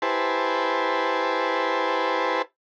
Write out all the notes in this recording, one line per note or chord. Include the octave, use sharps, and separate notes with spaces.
E4 G4 B4 C5 G#5 A5